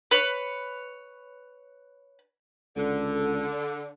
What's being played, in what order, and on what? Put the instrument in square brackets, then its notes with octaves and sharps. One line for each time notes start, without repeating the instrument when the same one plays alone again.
[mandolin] B4 C#5
[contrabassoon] C#2 [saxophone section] D3 [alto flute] A4